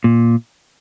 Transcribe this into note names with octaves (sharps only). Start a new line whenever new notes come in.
A#2